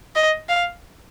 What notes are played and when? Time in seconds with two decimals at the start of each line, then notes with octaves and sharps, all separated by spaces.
0.16 D#5
0.49 F5